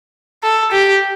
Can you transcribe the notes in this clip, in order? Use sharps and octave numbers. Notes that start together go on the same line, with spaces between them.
A4
G4